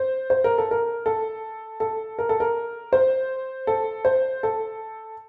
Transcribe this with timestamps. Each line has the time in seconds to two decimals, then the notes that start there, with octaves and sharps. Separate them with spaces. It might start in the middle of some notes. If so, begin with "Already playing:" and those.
Already playing: C5
0.30 C5
0.44 A#4
0.58 A4
0.71 A#4
1.06 A4
1.80 A4
2.19 A#4
2.29 A4
2.40 A#4
2.93 C5
3.67 A4
4.05 C5
4.43 A4